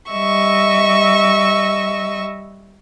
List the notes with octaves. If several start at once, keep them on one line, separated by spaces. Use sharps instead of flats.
G3 D#5 E5 C#6 E6